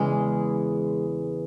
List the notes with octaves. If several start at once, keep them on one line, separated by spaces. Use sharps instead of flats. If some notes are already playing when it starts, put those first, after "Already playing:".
Already playing: E2 C#3 E3 G#3